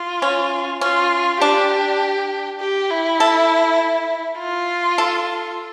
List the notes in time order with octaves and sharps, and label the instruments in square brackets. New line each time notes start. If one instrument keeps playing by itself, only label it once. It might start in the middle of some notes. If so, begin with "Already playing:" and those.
Already playing: [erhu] F4
[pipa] C#4
[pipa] C#4 [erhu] F4
[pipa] D4 [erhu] G4
[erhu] G4
E4
[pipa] A4
[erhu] F4
[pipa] A4